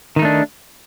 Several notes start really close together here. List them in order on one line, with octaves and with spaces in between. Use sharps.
D#3 D#4 A3 D4